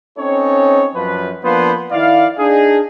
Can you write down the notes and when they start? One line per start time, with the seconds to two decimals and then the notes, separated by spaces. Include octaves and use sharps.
0.18 C4 C#4 D#4 A4 C#5
0.96 F#2 F3 B4
1.44 F3 A#3 B3 D4 B4 C5
1.92 D#3 E4 D5 F5
2.38 D4 D#4 G#4